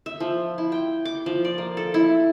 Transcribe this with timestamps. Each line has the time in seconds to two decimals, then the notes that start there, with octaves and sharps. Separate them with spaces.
0.06 E5
0.20 F3
0.58 E4
0.72 G5
1.05 D6
1.26 F3
1.45 D5
1.58 A#3
1.77 A4
1.94 E4